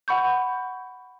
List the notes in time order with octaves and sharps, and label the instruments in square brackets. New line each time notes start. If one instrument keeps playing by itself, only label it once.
[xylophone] F#5 B5 C#6 G6